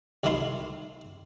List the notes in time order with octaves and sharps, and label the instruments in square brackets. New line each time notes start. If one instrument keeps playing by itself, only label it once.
[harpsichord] C2 D#3 A3 E4 F4 C6